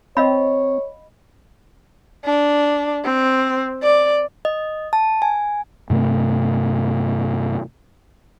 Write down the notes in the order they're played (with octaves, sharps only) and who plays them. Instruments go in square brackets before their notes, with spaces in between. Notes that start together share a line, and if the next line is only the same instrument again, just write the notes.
[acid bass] C4 [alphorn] C#5 [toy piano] D#5 F5 B5
[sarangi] D4
C4
D5
[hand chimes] D#5
A5
G#5
[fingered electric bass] G2 C3 A3 C4